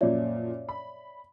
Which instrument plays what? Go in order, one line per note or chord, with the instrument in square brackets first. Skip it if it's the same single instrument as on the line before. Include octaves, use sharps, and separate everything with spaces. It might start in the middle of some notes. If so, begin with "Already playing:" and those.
[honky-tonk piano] F#2 A#2 F3 [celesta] C#5 D5 E5
[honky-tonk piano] B5